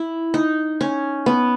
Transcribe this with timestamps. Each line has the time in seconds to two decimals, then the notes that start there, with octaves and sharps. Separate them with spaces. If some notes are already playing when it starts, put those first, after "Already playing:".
Already playing: E4
0.34 D#4
0.81 C#4
1.26 B3